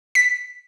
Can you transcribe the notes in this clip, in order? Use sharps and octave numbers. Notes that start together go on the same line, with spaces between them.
B6